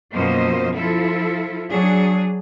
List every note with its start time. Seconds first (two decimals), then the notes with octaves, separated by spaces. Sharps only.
0.15 F#2 B2 F3 A#3 C5 D#5
0.74 F3 E4 F4 A4
1.71 F#3 D4 G#4